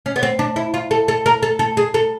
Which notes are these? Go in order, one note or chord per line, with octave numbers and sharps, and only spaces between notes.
C#4
B3
C4
D4
E4
F4
A4
A4
A#4
A4
A4
G#4
A4